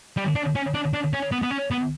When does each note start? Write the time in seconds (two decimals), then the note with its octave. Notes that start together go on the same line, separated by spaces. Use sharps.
0.17 G3
0.35 D4
0.55 C#4
0.74 D4
0.93 D4
1.13 C#4
1.32 B3
1.42 B3
1.51 C#4
1.71 B3